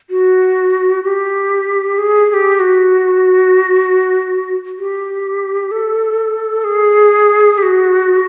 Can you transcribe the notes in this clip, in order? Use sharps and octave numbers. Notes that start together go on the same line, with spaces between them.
F#4
G4
G#4
G#4
G4
F#4
G4
A4
G#4
G4
F#4